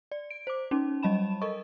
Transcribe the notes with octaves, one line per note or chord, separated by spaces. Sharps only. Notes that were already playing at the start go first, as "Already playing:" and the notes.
D5
D7
C5 D6
C#4 D#4
F#3 G3 D#5 A5 B5 E7
A4 A#4 D#5 C#6